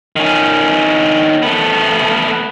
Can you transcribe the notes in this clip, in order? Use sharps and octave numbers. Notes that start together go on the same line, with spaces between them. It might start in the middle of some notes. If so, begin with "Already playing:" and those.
D#3 C#4
A3 B3